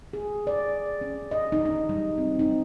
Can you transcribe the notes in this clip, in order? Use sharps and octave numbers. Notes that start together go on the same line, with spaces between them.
G#4
D5
C#4
D#5
D#4
D#4
G3
C4
D#4